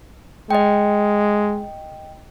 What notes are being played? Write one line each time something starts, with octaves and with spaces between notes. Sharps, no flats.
G#3 D#5 G5